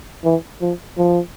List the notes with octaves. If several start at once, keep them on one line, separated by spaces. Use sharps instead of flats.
E3
F3
F3